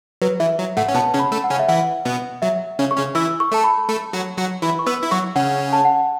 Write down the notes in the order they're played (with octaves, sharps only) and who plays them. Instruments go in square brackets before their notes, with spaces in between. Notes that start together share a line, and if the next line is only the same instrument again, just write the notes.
[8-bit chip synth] F#3 [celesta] B4
[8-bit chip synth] E3 [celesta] E5
[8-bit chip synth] F#3
[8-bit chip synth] A2 A3 [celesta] F#5
[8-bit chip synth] C#4
[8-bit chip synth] B2 B3 [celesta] A5
[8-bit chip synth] C#3 C#4
[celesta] B5
[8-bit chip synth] A3 A4
[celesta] F#5
[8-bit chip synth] C#3 C#4
[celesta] E5
[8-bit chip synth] E3 E4 [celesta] F#5
[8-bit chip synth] B2 B3
[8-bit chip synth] F#3 [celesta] E5
[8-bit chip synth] C#3 C#4
[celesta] C#6
[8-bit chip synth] C#3 C#4
[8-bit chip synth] E3 E4 [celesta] E6
[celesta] C#6
[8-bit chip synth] A3 A4 [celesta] A5
[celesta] B5
[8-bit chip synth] A3 A4
F#3 F#4
F#3 F#4
[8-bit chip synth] E3 E4 [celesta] B5
[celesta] C#6
[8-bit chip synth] B3 B4 [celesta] E6
[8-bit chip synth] E4
[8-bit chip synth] F#3 F#4 [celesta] C#6
[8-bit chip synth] C#3 C#4 [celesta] F#5
[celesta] A5
F#5